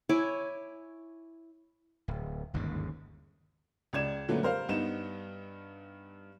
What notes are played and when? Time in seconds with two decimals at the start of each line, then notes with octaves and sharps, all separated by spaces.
0.09 E4 C#5 G#5 D6
2.08 D1
2.54 G1 D#2 G#2 C#3
3.93 C#2 D5 G#6 E7
4.28 A#2 D3 F#3 A3 B3
4.42 G3 A#4 C5 F5
4.69 G2 B3 D#4 E7